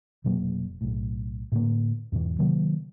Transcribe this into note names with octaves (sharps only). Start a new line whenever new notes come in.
F1 B2 F#3 A#3
B1 A2
A2 D3 A#3
E2 G#2 B2 E3
C3 D#3 F#3 A#3